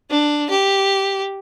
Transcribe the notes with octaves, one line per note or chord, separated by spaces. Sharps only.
D4
G4